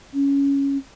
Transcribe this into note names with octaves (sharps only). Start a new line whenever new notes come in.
C#4